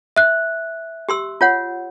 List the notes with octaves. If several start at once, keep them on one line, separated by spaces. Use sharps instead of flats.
E5 F#6
G4 C6 E6
F4 C#5 F#5